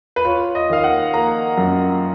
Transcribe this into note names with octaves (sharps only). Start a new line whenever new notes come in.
B4
F4 C#5
D#5
D#3 F5
F#5
A#3 A#5
F#2